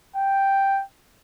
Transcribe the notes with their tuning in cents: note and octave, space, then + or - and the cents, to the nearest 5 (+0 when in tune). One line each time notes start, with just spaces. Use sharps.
G5 +0